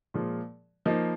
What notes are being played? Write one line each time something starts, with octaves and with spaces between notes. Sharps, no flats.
A#2 F3 G#3
F3 A#3 D#4